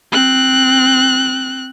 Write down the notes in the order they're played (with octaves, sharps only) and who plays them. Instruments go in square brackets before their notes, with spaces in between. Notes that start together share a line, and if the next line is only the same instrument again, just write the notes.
[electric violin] C4 F#6